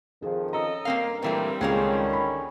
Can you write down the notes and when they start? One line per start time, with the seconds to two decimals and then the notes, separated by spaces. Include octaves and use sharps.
0.22 F2 D#3 F3 G#4
0.53 C#4 A4 D#5 A#5
0.85 G2 A#3 C4 A#4 F5
1.22 A#2 E3 G3 A3 C4
1.61 C#2 D3 D#3 G#3 A#3 C#4 F4
2.13 B5